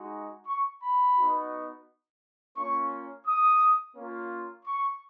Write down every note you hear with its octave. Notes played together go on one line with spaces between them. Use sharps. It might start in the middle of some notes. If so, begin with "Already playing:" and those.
Already playing: G#3 D#4 F#4
C#6
B5
B3 D#4 F#4
A#3 C#4 F4 C#6
D#6
A#3 C#4 F4
C#6